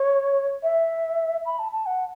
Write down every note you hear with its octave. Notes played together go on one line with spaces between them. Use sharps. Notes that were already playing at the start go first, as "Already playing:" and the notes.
Already playing: C#5
E5
B5
A5
A5
F#5